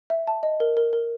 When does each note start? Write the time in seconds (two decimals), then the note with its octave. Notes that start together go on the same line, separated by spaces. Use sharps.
0.10 E5
0.27 A5
0.43 D#5
0.60 A#4
0.77 A#4
0.93 A#4